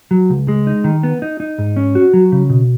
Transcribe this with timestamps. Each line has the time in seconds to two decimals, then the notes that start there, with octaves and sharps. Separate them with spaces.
0.11 F#3
0.30 C#2
0.48 G#3
0.67 D#4
0.84 D#3
1.03 B3
1.22 D#4
1.40 D#4
1.58 G#2
1.76 C#4
1.95 F#4
2.14 F#3
2.32 C#3
2.50 B2